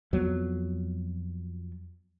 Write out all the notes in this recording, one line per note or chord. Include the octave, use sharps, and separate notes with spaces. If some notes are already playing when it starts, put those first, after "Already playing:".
F2 F#3 B3